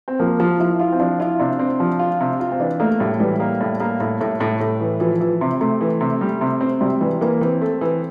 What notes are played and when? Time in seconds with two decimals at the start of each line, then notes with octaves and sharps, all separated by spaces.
0.08 C4
0.19 F3 A#3
0.39 F3 F4
0.60 F3 E4
0.79 E4 F4
0.92 C4
1.00 F3 D4
1.20 E4 F4
1.39 C3 D4
1.59 C4
1.80 F3
1.99 F4
2.20 C3
2.40 F4
2.52 C4
2.60 E3 D4
2.80 A3 A#3
3.00 A2 G3
3.20 E3 G3
3.40 A#3
3.60 A2
3.80 A#3
4.00 A2
4.21 A2
4.40 A2
4.60 A2
4.81 E3
5.00 E3 F3
5.21 E3
5.41 C3
5.61 C3 A3
5.81 E3
6.00 C3
6.21 G3
6.41 C3
6.61 C4
6.81 C3 G3
7.01 E3 G3
7.21 E3 A#3
7.41 E3 C4
7.61 A3
7.81 E3